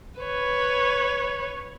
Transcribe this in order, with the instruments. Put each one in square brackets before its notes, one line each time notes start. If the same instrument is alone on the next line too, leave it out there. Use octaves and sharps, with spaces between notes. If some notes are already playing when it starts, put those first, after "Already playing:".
[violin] B4 C#5